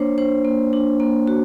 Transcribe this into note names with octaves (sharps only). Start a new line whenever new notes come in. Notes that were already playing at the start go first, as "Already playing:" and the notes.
Already playing: A#3 D4 C5 C#5
D4 C5
A#3
D4
A#3
F#4